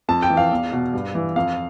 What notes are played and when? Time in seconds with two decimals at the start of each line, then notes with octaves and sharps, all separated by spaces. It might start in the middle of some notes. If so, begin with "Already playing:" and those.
0.08 F2 A5
0.22 G5
0.30 E3
0.37 F5
0.51 E2
0.72 B2
0.94 G2
1.15 E3
1.36 F2 F5